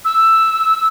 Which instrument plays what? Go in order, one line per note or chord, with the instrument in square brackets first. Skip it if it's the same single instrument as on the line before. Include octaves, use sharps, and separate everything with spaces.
[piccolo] E6